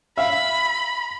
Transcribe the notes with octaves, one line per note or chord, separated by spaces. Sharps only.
E5 F5 B5